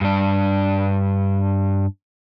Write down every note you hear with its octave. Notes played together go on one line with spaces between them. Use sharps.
G2 D4